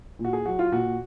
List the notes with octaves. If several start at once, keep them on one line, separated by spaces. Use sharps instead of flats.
A#2
F#4
G#4
F#3 F#4
F4
A#2 F#4